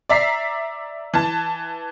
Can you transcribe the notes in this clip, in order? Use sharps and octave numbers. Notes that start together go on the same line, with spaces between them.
D5 E5 A#5 B6 C7
E3 A5